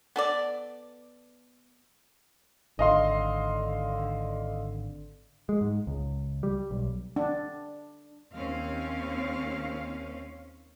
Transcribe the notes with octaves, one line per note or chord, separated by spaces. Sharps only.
B3 A4 D5
G#1 D3 D#5 F5 C6
G#3
G#2
C#2
G3
B1
D4
D#2 C4 C#4 F5